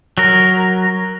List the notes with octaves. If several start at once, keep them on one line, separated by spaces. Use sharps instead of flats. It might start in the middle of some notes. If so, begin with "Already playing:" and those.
F#3 A#4